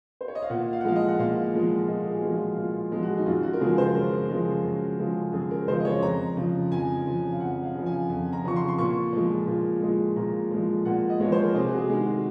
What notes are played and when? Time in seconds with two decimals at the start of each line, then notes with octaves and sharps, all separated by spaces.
0.21 C5
0.28 C#5
0.35 D#5
0.42 F5
0.50 A#2 F#5
0.73 F5
0.81 F#5
0.85 F3 G#3 F5
0.96 D#5
1.08 F#5
1.19 A#2 F5
1.54 F3 G#3
1.88 A#2 D#5
2.05 G#4
2.11 F#4
2.23 F3 G#3
2.34 F4
2.57 A#2 F4
2.92 F3 G#3
3.03 F#4
3.17 D#4
3.26 F#2 F4
3.43 F#4
3.53 A#4
3.60 C#3 F3 G#3 G#4
3.78 C5
3.95 F#2 A#4
4.30 C#3 F3 G#3
4.64 F#2
4.99 C#3 F3 G#3
5.33 F#2 G#4
5.51 A#4
5.68 C#3 F3 G#3 C5
5.80 D#5
5.85 C#5
6.02 F2 A#5
6.37 C#3 F3
6.71 F2 G#5
7.06 C#3 F3
7.32 F5
7.40 F2 F#5
7.63 F5
7.74 C#3 F3
7.86 G#5
8.09 F2 G#5
8.33 A#5
8.44 C#3 F3 C#6
8.56 C6
8.68 C6
8.78 A#2 C#6
9.13 F3 G#3
9.47 A#2
9.82 F3 G#3
10.16 A#2 A#5
10.51 F3 G#3
10.85 A#2 F#5
11.10 D#5
11.20 F3 G#3 C#5
11.32 C5
11.44 A#4
11.55 C3 G#4
11.69 F#4
11.78 G#4
11.90 D#3 G#3
12.00 F#4